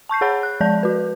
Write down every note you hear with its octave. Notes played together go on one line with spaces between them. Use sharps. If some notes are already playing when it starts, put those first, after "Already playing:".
A5 C#6 G6 C7
G#4 C#5 F#5 B5 G6
F#6
F3 G#3 D5 A5 G6
F#4 B4